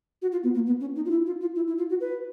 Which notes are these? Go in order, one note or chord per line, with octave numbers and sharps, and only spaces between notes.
F#4
F4
B3
A#3
B3
C#4
D#4
F4
E4
F4
F4
E4
E4
F4
F#4
B4